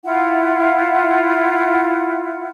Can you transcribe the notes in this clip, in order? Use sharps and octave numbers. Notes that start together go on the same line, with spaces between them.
E4 F4 F#5